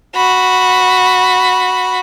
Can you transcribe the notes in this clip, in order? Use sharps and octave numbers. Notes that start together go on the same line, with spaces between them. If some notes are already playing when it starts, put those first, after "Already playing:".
F#4 B5